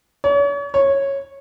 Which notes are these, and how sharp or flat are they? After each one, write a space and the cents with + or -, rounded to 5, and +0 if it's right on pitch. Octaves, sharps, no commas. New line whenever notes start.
C#5 +40
C#5 -10